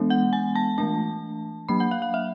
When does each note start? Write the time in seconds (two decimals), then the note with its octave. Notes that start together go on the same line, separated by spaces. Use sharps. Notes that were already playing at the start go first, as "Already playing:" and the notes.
Already playing: E3 G#3 B3 D4
0.10 F#5
0.33 G#5
0.56 A5
0.78 E3 A3 D4 A5
1.69 F#3 A#3 D4 B5
1.80 F#5
1.91 F5
2.02 F5
2.14 E5